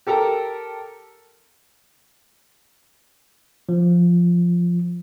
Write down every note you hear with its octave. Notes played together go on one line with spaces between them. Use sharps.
G4 A4 A#4 A#5
F3